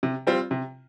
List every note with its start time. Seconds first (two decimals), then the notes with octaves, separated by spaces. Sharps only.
0.03 C3
0.27 G3 C4 F4
0.51 C3